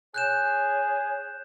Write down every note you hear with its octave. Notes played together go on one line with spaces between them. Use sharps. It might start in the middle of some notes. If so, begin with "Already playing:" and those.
G#4 C#5 F#6 G6 E7